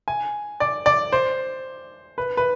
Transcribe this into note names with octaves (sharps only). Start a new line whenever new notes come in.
G#5
D5
D5
C5
B4
B4